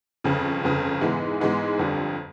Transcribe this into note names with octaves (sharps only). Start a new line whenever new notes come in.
G1 F2 C#3
G1 F2 C#3
G#2 E3 G#3 B3
G#2 E3 G#3 B3
G1 F2 D3 G3